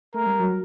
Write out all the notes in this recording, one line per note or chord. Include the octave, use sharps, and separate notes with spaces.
A3 A#4
G3
F#3